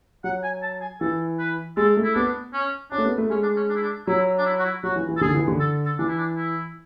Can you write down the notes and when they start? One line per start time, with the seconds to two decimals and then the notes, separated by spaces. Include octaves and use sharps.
0.24 F#3 F#5
0.43 G#5
0.62 A5
0.81 G#5
1.01 E3 A4
1.39 B4
1.77 G#3 A4
1.97 A3
2.04 E4
2.15 B3 D4
2.53 C#4
2.91 C#4 D4
2.98 A3
3.05 B3
3.18 A3
3.30 G#3 C#4
3.43 D4
3.56 C#4
3.69 D4
3.75 E4
3.83 D4
4.07 F#3 E4
4.38 D4
4.46 E4
4.59 F#4
4.65 E4
4.83 F#3 F#4
4.96 E3
5.09 E3
5.17 A4
5.21 D3 G#4
5.34 E3
5.48 D3
5.60 A4
5.86 A4
5.99 E3 D4
6.08 E4
6.18 D4
6.37 E4